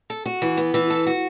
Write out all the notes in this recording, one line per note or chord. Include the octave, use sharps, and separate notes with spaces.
A4
F#4
E3
B3
E3
A4
F#4